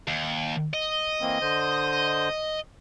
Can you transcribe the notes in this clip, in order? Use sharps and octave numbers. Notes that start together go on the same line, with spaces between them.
D#2
D#5
E3 A#3 C4
D3 C5